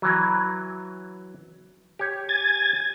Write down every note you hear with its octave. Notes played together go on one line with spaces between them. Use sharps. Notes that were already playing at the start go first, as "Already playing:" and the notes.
E3 F#3
G4 C#5
G#5 G#6 A6